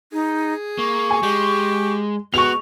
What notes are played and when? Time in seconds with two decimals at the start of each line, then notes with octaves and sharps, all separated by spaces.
0.12 D#4 G#4
0.78 A#3 C#6
1.11 G#5
1.23 G#3 G4
2.34 G#3 B3 F#4 C#6 F7